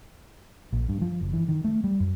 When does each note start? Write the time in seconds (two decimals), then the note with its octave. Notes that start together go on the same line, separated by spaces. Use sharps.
0.73 A#1
0.89 G2
1.01 F3
1.21 F#1
1.34 E3
1.49 D#3
1.64 A3
1.84 G3
2.00 F#2